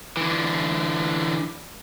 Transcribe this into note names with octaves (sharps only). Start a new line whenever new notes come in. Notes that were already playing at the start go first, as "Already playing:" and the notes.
D3 E3